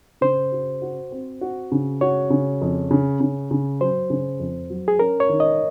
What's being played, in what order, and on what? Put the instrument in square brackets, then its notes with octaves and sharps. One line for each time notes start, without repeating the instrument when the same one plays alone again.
[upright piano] C#3 [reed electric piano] C5
[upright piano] F#4
F#4
C4
F#4
C#3
[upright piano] F#4 [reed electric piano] C#5
[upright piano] C#3
F2
C#3
C#3
C#3
[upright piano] F#3 [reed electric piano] C5
[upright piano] C#3
F2
F#3
[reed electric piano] G#4
[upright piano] C#4 [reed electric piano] A#4
[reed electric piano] C#5
[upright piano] D#3
[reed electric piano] D#5